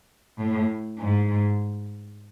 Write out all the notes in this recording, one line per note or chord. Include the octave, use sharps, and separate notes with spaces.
A2
G#2